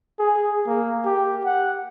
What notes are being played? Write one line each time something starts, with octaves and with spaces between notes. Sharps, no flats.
G#4
A#3
G4
F#5